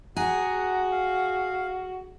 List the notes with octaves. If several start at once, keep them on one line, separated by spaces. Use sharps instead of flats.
F#4 G#4 F#5 A#5
F5